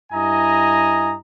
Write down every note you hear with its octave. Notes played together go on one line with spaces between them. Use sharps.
G2 E4 D#5 G#5 A#5